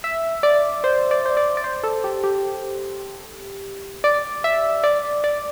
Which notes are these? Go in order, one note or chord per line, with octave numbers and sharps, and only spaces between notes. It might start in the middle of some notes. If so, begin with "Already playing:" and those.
E5
D5
C5
D5
C5
D5
D5
C5
A4
G4
G4
D5
E5
D5
D5